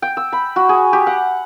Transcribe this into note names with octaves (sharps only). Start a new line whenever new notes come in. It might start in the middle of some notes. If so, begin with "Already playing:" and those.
G5
E6
B5
F#4
G#4
G4
F#5